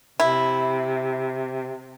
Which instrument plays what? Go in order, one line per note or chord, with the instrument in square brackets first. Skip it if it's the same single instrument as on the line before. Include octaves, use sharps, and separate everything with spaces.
[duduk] C3 [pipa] E4